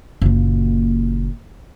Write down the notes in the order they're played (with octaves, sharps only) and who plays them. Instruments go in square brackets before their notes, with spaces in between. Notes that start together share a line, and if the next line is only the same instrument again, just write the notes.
[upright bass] F#1 A#2